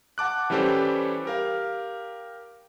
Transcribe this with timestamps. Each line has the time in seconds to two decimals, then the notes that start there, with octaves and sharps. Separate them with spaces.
0.18 F#5 A5 D6 F#6
0.50 E3 G3 C#4 G4 A4 C5
1.25 G4 A#4 F5